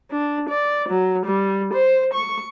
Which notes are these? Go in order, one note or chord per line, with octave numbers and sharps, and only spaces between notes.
D4
D5
F#3
G3
C5
C#6